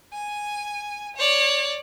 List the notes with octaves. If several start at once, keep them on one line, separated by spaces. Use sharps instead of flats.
G#5
C#5 D5